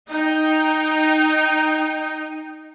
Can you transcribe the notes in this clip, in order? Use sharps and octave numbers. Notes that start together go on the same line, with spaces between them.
D#4 G5